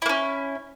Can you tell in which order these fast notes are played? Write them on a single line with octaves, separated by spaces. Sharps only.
E4 A#3 C#4